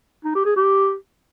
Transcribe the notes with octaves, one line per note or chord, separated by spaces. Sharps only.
D#4
G4
G#4
G4